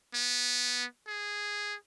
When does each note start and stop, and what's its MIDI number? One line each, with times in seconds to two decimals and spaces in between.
0.15 0.85 59
1.08 1.75 68